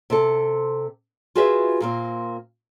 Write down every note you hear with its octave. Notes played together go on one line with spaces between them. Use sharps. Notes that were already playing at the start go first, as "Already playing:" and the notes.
C3 C4 A4
F4 F#4 G#4 B4 E5
A#2 A#3 C4